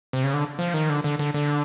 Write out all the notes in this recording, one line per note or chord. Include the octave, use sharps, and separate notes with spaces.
C3
C#3
D3
F3
D#3
D3
D3
D3
D3